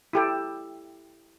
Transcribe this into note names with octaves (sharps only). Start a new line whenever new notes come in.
E4 G4 A4